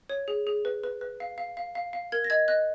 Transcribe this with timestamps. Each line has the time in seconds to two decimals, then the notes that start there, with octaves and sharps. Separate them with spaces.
0.09 C#5
0.28 G#4
0.47 G#4
0.65 B4
0.84 B4
1.01 B4
1.20 F5
1.38 F5
1.57 F5
1.75 F5
1.93 F5
2.12 A#4 G#6
2.24 A#6
2.30 D#5 G#6
2.48 D#5 F#6